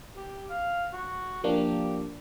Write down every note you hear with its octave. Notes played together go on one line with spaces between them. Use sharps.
G4
F5
F#4
F3 A#3 D4 G4